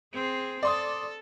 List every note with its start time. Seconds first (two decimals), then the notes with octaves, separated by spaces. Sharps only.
0.13 C4 G#4
0.63 A4 D5 C6 D#6